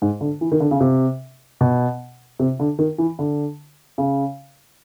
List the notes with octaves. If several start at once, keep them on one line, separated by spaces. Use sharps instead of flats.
G#2
D3
E3
D#3
D3
C#3
C3
B2
C3
D3
D#3
E3
D3
C#3